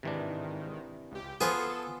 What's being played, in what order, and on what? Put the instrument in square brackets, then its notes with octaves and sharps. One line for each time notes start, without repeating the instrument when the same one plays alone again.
[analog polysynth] G#2 D#3 [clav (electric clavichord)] C3 E3 D4
[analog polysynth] C#2 G4
[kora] B3 F4 [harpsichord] G#4 C5 [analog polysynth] A4